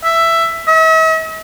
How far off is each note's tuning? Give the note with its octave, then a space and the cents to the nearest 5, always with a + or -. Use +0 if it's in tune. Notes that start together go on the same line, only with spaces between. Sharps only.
E5 +10
E5 -45